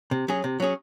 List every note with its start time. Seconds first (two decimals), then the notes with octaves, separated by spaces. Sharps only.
0.11 C3
0.28 F#3 C#4 G#4
0.44 C3
0.60 F#3 C#4 G#4